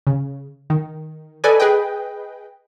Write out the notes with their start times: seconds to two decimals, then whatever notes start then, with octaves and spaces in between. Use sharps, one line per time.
0.07 C#3
0.70 D#3
1.44 A4 B4 D5 D#5 G#5
1.60 G#4 B4 D#5 G5